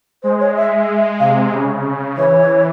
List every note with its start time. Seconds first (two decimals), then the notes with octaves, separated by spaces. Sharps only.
0.23 G#3 C5
0.40 C#5
0.56 E5
1.20 C3 F5
1.52 C#3
1.85 C#3
2.16 E3 C#5